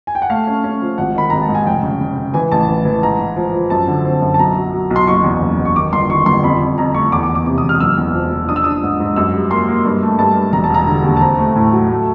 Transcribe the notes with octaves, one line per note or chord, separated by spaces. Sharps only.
G#5
G5
F#5
A3 F5
C#4
C#4
F3
G#1 F#5
D#3 B5
G#1 A#5
A5
G#2
G#5
F1 G5
C#3
C#3
C#3
E3 G#5
A1 A5
E3
E3
G#2 A#5
G#2
F3
F3
F#2 A5
D3
C4
F#2
A5
B1 A#5
F#3
F#3
B1
C6
F#1 C#6
E2
F#1
F#1
C#6
D#3 D6
G1 C6
D#3 C#6
G1 C6
F2 B5
F2
F2 A#5
A3 C#6
E2 D6
D6
E2
D6
C3 D6
D#6
E1
F6
D#6
F#1 E6
E2
F3
F3
D4 D#6
E6
D4 D#6
G#2
G#2
F#2 E6
G3
A#3 C6
A#3
G2
A3
G2 A5
G2
E1 A#5
A5
E1 A#5
D3
D#2
A5
C4 A#5
A3
A2
F#3
A3